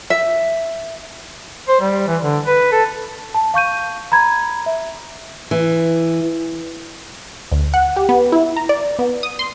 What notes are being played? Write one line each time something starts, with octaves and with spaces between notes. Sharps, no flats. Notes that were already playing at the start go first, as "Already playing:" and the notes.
E5
C5
G3
E3
D3
B4
A4
A5
F5 C#6 G6 D#7
A#5 B5 G#6
E5
E3
D2
F#5
G4
B3
E4
A#5
D5
B3
D#6
C6